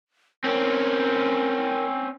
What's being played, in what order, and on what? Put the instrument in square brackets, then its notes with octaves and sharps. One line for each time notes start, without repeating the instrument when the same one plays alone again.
[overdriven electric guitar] C4 C#4 [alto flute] A#4